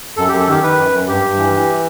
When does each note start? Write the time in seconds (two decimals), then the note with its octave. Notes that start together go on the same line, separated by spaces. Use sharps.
0.17 F#2 A4
0.28 G4
0.32 F#2
0.40 A4
0.48 D#3 G4
0.63 D#3 B4
0.78 F#2
0.92 F#2
1.08 G2 G4
1.22 G2
1.37 E3
1.53 E3